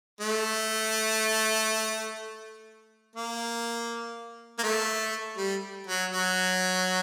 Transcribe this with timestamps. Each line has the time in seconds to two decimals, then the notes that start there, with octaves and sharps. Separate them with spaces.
0.21 A3
3.16 A#3
4.58 A#3
4.63 A3
5.37 G3
5.87 F#3
6.11 F#3